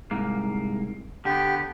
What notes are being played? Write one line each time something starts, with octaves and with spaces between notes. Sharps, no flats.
C2 G#2 A#3
D3 B3 G4